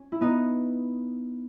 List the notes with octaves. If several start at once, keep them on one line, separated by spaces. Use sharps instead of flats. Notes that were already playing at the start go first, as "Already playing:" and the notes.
Already playing: C#4
E4
B3 D#4